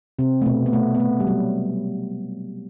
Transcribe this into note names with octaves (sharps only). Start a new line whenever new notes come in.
C3 C4
A3
B2 B3
B3
A3
B3
A3
G3
F#3